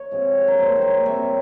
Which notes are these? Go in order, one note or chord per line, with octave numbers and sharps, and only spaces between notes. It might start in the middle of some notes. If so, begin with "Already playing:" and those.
Already playing: C#5
C3 F3 G#3
A#4
A#2 G3 C5
C5
C#5
C3 G3 E5